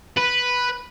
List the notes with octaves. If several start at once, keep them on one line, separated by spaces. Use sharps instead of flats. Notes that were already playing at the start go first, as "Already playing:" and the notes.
B4